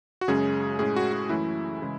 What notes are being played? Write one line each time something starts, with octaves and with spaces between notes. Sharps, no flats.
F#4
F#2 C#3 G#3 C#4 G#4
A2 G#3 C#4 G#4
F#4
F#4
F#2 E3 A3 C#4 E4
C#3 E3 G#3